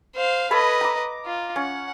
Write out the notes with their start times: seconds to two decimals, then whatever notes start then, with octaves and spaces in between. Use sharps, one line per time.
0.15 C5 F5
0.51 A4 B4 C#5 D#5 B5
0.81 A#5 D6
1.25 F4
1.56 C#4 F#5